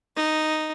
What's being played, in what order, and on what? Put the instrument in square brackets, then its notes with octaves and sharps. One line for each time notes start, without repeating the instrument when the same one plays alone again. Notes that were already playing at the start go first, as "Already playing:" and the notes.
[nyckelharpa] D#4